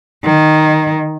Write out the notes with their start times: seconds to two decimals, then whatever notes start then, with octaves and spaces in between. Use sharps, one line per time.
0.24 D#3